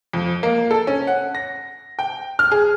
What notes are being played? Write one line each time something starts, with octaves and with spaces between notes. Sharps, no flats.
F2
A#3
A4
C#4
F#5
A#6
G5
F6
G#4